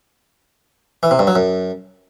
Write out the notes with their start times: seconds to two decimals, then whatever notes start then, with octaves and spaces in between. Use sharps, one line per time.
1.03 E3
1.11 C3
1.19 G2
1.27 F#3
1.35 F#2